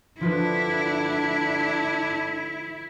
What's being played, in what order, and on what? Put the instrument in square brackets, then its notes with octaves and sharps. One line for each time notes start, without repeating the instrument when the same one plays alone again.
[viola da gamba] D3 [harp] F3 F4 B4 [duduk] D4 [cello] E4